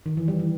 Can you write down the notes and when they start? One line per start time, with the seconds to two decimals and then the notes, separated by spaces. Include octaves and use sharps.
0.06 D#3
0.17 E3
0.28 G3
0.39 E3